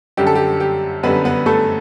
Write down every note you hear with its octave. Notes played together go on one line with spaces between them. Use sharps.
F#2 D3 G3 G4
A4
G4
G4
F#2 D3 G3 B3 B4
B3 B4
A3 A4